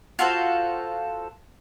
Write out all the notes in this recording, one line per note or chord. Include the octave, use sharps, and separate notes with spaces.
F4 F#4 A4 C5